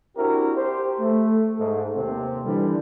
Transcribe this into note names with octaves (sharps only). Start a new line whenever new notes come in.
C4 D4 E4 F#4 G4 A#4
G4 C5
A3
G#2 A3
D#2 C3 C4
D3 E3 G3